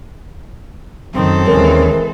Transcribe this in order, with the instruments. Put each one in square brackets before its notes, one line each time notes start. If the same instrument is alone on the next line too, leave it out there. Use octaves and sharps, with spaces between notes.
[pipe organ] F#2 [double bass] D#3 [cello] C4 A4
[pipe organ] D#2 C#4 [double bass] E3 G#3 [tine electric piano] A#4